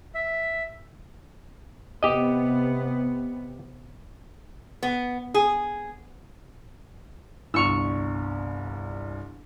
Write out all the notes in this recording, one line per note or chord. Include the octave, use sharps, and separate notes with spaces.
E5
C3 B3 G4 D#5
B3
G#4
G1 C2 C#6 E6 F7